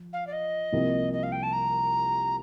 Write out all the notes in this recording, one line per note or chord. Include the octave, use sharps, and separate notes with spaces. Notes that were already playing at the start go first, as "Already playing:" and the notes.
Already playing: F3
F5
D5
D#5
C2 C3 F3 A#3
D#5
F5
G5
A5
A#5